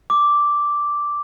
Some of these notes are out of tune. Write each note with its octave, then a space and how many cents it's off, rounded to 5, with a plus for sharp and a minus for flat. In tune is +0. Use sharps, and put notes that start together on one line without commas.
D6 -5